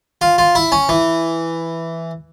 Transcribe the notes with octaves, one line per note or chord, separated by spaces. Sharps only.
F4
F4
E4
C#4
E3